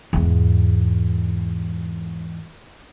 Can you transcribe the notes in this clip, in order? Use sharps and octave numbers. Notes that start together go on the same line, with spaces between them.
E2 G#2